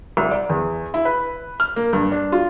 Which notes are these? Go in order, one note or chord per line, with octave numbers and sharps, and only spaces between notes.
C2
D5
E2
E4
B4
F6
A#3
G2
D4
F4